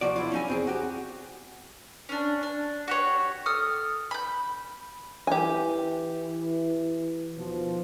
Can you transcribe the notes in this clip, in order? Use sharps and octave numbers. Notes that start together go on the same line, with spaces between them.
D#2 F3 F#4 D5
B1 E4 F4
C#4 D#4 G#5
E2 C4 G#4
F#4 G4
C#4 D4
D4
F#4 G4 C#5
A4 D#6 F6
B5 G6
E3 G4 G#5
D#2 B2 F3